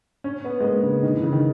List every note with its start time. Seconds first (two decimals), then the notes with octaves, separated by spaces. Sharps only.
0.24 C#4
0.45 B3
0.60 G#3
0.64 A#3
0.83 C#3
1.03 D#3
1.14 E3
1.23 C#3
1.33 D#3